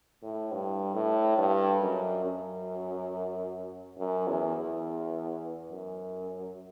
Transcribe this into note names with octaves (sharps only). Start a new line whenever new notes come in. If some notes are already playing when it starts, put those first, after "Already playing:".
A2
G2
A2
G2
F#2
F#2
F#2
E2
E2
F#2